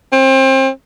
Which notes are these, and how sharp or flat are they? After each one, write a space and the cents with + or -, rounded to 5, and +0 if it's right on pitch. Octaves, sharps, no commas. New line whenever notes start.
C4 +30